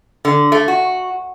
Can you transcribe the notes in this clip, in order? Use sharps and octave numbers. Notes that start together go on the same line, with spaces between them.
D3
A3
F#4